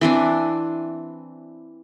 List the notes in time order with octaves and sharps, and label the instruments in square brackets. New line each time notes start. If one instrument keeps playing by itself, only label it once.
[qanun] E3 C4 D4